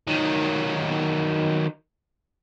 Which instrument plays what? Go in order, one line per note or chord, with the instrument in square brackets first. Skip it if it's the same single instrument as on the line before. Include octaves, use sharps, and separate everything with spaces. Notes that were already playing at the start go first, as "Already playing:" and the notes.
[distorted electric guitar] D#3 F#3